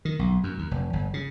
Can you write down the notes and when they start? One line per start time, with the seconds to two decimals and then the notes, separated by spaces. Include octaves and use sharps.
0.05 D#3
0.19 B1
0.43 F#2
0.59 D#2
0.71 F1
0.93 G1
1.14 C#3